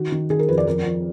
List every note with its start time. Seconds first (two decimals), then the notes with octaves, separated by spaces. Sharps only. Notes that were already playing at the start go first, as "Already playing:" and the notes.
Already playing: D#3 F#4
0.12 D#3
0.30 D#3 G#4
0.39 A#4
0.49 F2 B4
0.58 D5
0.67 F2 A#4
0.85 F2